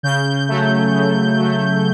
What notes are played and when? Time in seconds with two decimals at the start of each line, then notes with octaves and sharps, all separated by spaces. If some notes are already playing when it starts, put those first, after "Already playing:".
0.03 C#3 G6
0.48 F#3 A3
0.94 C#3
1.38 F#3 A3